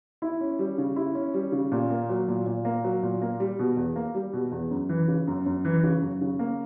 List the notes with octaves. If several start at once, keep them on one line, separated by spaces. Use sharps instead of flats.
E4
C#4
G3
C#3
E4
C#4
G3
C#3
A#2
A#3
F#3
A#2
A#2
A#3
F#3
A#2
A#3
G3
B2
E2
A#3
G3
B2
E2
F#2
E3
C#3
F#2
F#2
E3
C#3
F#2
C#3
A#3